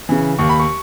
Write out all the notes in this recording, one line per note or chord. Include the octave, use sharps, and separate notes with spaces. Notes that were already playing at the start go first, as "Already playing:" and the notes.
C#3 E3
D#2 C#6
B5
C#6